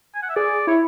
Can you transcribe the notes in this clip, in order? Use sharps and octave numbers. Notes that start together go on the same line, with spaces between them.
G#5
F#5
E5
G#4 D5
E4 C#5